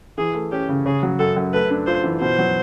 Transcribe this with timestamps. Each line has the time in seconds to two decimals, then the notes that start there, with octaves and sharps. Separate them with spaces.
0.18 E3 G#4
0.35 A3
0.52 C#4 G4
0.69 C#3
0.85 C#3 G#4
1.03 F#3
1.19 F#2 A4
1.36 F#2
1.53 A3 B4
1.71 D4
1.87 F4 C5
2.04 E3
2.21 B2 C5
2.39 F#3